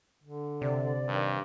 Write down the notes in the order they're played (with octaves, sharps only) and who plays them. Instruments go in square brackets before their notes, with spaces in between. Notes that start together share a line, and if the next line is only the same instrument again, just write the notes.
[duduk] D3
[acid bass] C3 [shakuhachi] D5
[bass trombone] G2 [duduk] D#3